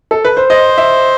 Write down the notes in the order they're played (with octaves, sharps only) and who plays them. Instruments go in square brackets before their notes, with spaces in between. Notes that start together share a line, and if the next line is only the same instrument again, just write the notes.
[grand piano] A4
B4
C5
[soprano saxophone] C5 [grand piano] D#5
[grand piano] E5